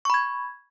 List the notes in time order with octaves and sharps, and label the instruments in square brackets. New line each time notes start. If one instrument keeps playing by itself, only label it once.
[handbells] C#6
B5
G#6